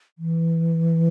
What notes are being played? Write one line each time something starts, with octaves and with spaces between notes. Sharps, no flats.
E3